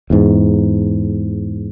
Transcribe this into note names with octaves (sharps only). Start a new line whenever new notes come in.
E2 G#2